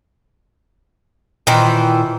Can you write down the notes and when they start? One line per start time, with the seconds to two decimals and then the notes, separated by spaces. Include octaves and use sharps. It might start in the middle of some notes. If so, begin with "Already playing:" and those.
1.47 A#2 D#3 E3 C5